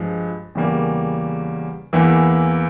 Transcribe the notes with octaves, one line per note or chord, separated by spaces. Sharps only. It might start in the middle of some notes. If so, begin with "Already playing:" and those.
Already playing: G2 F3 G#3
E2 C#3 G3 A#3
E2 E3 A#3 E4